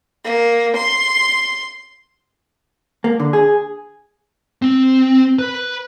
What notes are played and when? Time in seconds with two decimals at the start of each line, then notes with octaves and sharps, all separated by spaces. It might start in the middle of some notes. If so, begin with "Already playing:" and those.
0.24 A#3
0.76 C6
3.04 A#3
3.20 D3
3.33 G#4
4.62 C4
5.39 B4 B5